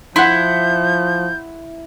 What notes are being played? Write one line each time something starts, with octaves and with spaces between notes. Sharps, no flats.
F3 E4 F#5 C6 G6